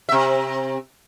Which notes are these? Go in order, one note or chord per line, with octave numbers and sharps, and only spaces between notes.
C3 E5